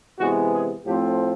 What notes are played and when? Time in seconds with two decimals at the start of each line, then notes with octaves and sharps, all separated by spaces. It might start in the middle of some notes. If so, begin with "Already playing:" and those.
0.19 C3 E3 G#3 B3 F#4
0.53 G#4
0.86 A2 F3 A3 C4 G4